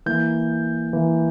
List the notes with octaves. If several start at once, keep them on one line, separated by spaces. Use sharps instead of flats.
E3 A#3 G6
E3 A#3